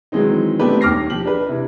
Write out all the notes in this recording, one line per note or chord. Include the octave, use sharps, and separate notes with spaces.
D#3 E3 F#3 G#3 C4 D#4
A3 B3 C4 D4 G4 B4
D#1 D#2 D6 F6 A#6 C7
F3 G4 F#7
D4 B4
C3 E3